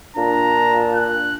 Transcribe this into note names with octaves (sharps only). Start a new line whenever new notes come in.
A#2 D4 A#5
F#6